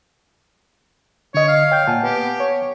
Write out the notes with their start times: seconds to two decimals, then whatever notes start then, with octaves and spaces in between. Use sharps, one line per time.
1.34 D3 C#5 D#5
1.48 F5
1.72 C#5 G5 G6
1.87 A#2 F#5 G#5 A5
2.03 B3 G4
2.40 C#5